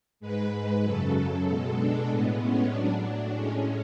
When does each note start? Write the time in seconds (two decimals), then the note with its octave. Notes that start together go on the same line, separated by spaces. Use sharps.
0.20 G#2 G#3 B4
0.51 B4
0.83 F#2 C#3 F#3 A4
1.46 B2 G#3
1.77 D4
2.09 A2 G#3 B3
2.40 C#4
2.71 A2 F#3 D4
3.34 A2 G#3 C#4